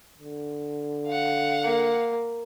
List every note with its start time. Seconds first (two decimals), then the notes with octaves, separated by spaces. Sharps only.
0.19 D3
1.07 F5 F#5
1.64 A#3